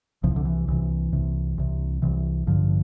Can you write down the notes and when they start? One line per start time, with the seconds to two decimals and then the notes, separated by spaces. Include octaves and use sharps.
0.23 C2 C3 F3
0.36 D3
0.45 E3
0.68 C2 C3 E3
1.12 C2 C3
1.58 C2 C3
2.02 C2 C3 E3
2.47 A1 G2 D3 F3